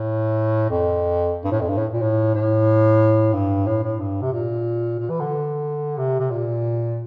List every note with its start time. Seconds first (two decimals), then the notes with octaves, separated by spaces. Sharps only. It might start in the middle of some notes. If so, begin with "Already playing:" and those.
Already playing: A2
0.70 F2
1.44 G2
1.51 A2
1.60 F2
1.68 G2
1.77 A2
1.93 A#2
2.01 A2
2.34 A2
3.33 G2
3.66 A2
3.83 A2
3.99 G2
4.22 C3
4.32 A#2
4.99 A#2
5.09 E3
5.20 D3
5.98 C3
6.19 C3
6.31 A#2